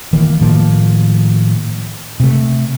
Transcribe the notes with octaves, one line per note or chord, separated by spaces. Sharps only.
D#3 E3 A#3
A2 D#3 F3 A#3
C3 A3